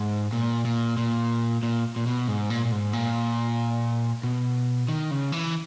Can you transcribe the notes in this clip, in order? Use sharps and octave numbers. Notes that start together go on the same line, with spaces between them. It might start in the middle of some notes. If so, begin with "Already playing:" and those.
Already playing: G#2
A#2
A#2
A#2
A#2
A#2
B2
G#2
A#2
A#2
G#2
A#2
B2
D#3
C#3
E3